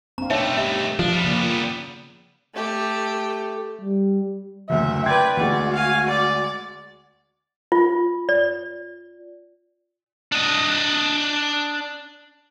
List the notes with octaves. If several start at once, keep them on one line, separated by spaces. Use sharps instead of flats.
C4 D4 F5 A#5
B2 A3 D#4 C#5 D5 E5
G4 D#5 E5
F3 D4
G3 B3
C#3 A#3 D5
A3 G4
G3
F#1 D2 E5
B4 D5 G5 C6 G#6
D2 G#3 F#4 D5
F5 G#5
D5
F4
D5
D4 D#5